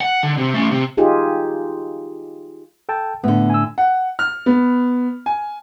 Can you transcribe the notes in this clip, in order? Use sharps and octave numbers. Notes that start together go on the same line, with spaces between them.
F#5
D3
C3
A3 C#4
C3
D#4 F4 G4 G#4
A4 G5 A5
A2 D3 B3
G#5 E6
F#5
F6
B3
G#5